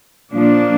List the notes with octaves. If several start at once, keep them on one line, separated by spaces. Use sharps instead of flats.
A#2 F3 A#3 D4